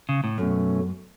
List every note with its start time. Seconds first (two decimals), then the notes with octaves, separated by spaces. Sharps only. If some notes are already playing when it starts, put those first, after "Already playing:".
0.09 C#3
0.24 A2
0.38 F#2 B2 F#3 A3 C#4